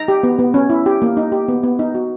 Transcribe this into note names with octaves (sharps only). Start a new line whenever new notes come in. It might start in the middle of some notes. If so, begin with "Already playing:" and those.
Already playing: D#4 A#5
G4
B3
B3
C#4
E4
G4
A#3
D#4
G4
B3
B3
D#4
F#4